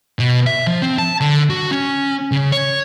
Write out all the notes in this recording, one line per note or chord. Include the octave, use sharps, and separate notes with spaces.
B2
E5
F3
C4
A5
D3
F#4
C#4
C#3
C#5